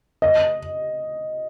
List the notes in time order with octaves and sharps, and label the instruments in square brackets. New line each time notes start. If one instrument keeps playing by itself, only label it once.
[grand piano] D#5